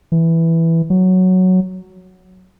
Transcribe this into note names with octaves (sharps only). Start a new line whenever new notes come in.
E3
F#3